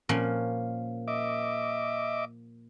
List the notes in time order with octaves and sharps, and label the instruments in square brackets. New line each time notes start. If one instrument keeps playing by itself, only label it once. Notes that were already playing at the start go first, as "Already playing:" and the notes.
[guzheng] A#2 F3 C#4
[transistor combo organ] D#5 E5 D6